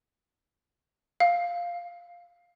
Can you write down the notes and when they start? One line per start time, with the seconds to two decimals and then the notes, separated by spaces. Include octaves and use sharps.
1.20 F5